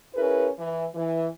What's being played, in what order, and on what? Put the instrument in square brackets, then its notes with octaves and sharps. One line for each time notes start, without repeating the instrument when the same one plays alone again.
[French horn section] C#4 E4 G#4 A#4 B4
E3
E3